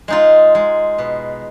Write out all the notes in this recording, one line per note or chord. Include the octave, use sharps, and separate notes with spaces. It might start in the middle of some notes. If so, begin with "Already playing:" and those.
G#3 D#4 F4
G#3
B2